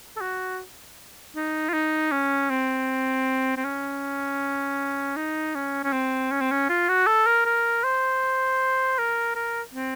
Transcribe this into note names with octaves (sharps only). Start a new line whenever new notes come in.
A4
F#4
D#4
F4
D#4
C#4
C4
C4
C#4
D#4
C#4
C#4
C4
C#4
C4
C#4
F4
F#4
A4
A#4
A#4
C5
A#4
A#4
C4